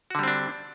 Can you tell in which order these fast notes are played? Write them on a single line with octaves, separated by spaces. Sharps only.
F#4 D3 G3 C4 D4